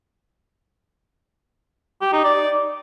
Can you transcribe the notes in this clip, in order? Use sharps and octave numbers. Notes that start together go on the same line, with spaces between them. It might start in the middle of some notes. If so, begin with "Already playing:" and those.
G4
D#4
D5